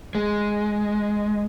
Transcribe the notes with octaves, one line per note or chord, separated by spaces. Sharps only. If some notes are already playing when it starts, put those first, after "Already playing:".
G#3